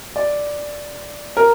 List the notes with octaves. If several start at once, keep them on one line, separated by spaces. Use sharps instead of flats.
D5
A#4